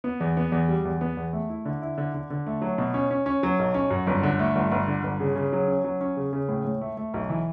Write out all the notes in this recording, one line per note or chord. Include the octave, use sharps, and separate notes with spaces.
B3
E2
B3
E2
G3
E2
B3
E2
A3
E4
D3
E4
D3
D3
D3
A3
F#3
B2
C#4
C#4
C#4
F#3
B1
C#4
F#2
G1
D3
A3
G1
G1
D3
G1
C#3
C#3
F#3
C#4
F#3
C#4
C#3
C#3
A2
A2
A3
A3
B1
E3